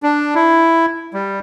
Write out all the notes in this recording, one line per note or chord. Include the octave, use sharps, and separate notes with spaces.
D4
E4
G3